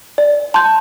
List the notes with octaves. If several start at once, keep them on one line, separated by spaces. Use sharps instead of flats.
D5
A5 C6 G6